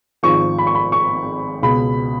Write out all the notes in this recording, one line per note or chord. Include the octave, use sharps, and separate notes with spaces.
G#1 G#2 F3 C#6
B5
C#6
B5
C#6
C#2 B2 B5